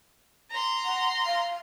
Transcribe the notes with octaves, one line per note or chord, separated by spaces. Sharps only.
A#5 C6
F#5
F5